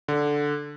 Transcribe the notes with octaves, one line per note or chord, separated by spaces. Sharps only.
D3